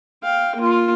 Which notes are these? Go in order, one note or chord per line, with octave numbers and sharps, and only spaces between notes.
F5 G5
A#3 F4